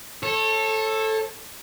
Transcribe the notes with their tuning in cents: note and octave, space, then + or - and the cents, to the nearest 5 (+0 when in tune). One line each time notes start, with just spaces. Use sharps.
A4 +0 C#5 -30